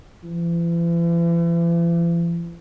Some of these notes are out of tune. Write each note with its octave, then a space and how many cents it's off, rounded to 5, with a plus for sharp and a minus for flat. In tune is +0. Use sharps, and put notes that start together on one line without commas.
E3 +45